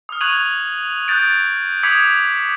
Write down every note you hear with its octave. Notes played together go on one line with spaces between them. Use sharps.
D#6 F6
C#6 F#6 G#6 D#7 F7 F#7
D#6 F#6 G6 A6 D7
D6 D#6 G#6 B6 C#7 F#7